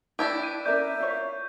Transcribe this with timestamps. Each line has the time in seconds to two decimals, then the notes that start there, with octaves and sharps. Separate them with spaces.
0.19 D4 E4 G4 B4
0.43 D#7
0.66 C#4 A#4 D5 E5 G6
1.00 F4 C#5